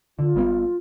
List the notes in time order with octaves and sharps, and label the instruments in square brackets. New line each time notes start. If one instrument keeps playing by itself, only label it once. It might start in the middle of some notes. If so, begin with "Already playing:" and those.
[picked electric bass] D3 [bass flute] F4
[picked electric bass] G#1 G3 B3